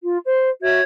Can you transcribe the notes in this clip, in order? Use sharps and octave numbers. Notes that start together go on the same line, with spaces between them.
F4
C5
F#4 C#5 E5 G#6